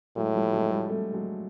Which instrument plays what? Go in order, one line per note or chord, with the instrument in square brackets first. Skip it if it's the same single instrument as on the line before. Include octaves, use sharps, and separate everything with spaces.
[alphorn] A2 [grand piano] F#3 G#3
[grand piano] F3 G3
F#3 G#3
G3 A3
G3 A3
F#3 G#3